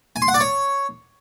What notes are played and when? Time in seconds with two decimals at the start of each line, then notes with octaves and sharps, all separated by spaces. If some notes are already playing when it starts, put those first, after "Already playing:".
0.16 G#5
0.22 C6
0.28 F#5
0.34 D5
0.40 C#5